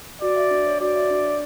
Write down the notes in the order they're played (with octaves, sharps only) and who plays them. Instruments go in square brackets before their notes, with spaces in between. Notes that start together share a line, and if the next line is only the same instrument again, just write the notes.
[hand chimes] F#4 [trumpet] D5
[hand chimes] E5
D4
C#5
[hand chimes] F#4 [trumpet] D5
[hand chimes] E5
D4
C#5